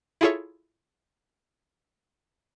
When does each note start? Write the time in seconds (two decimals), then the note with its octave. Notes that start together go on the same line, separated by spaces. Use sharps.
0.21 E4 F4 G#4 A4 C#5 E5